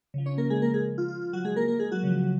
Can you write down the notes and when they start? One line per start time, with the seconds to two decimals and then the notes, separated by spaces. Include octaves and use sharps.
0.14 C#3 F3
0.26 C#4 C#5
0.38 A#3 A#4
0.50 G#3 G#4
0.62 A#3 A#4
0.74 G#3 G#4
0.98 F4
1.08 F4
1.21 F4
1.33 F#3 F#4
1.45 G#3 G#4
1.56 A#3 A#4
1.68 A#3 A#4
1.79 G#3 G#4
1.92 F#3 F#4
2.03 C#3 F3